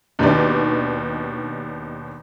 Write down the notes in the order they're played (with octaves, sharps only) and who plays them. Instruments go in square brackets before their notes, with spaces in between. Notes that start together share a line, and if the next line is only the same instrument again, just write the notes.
[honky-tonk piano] D#2 B2 D#3 D4 G4 D5